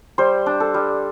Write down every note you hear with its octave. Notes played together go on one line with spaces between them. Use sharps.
G3 C5
D4
A4
G3